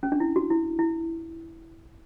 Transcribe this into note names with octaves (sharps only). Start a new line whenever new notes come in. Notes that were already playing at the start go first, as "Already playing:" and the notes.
C#4
D4
E4
F#4
E4
E4